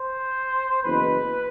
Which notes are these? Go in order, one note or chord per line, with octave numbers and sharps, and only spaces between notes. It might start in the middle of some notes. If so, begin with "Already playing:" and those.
Already playing: C5
F#1 E2 B2 B4